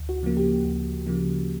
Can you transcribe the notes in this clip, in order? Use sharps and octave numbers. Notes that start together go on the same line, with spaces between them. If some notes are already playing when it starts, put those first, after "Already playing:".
Already playing: D2
F#4
C#3 F3 A#3
G4
D2
C#3 F3 A#3